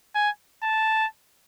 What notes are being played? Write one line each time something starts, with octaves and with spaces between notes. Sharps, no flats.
G#5
A5